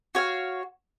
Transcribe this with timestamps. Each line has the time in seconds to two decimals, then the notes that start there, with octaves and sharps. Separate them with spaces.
0.15 F#4 C#5 F5